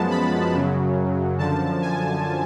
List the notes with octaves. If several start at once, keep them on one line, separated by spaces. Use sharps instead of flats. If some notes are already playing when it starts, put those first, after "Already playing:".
Already playing: F#2 F3 G#3 B3 A5
B5
F#2 C#3 F#3
F#2 D3 F3 A5
G#5